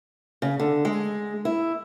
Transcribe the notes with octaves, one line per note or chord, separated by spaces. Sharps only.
C#3
D3
G#3
E4